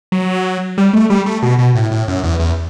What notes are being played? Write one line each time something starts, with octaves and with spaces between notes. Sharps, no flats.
F#3
G3
A3
G3
A3
B2
B2
A2
A2
F#2
E2
E2